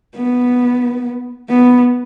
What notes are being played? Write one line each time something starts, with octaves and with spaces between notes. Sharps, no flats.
B3
B3